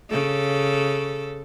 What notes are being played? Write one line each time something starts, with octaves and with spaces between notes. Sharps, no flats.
C#3 A4